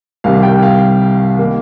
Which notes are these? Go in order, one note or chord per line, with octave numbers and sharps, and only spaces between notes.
C2 C3 D#3 G3 F5
G5
F5
D#3 A#3